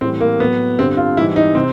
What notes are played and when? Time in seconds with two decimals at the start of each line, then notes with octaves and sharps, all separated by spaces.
0.01 A2 E3 G3 C4
0.20 A#3
0.40 A2 F#3 B3
0.79 G2 D3 G3 C4
0.97 F4
1.17 G#2 E3 G3 E4
1.36 D#4
1.55 C3 C4